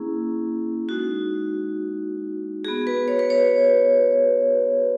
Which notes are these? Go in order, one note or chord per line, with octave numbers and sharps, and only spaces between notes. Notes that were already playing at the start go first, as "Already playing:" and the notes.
Already playing: A#3 C#4 E4 G#4
G#3 D#4 F#4
B3 F#4 G#4
B4
C#5
B4
C#5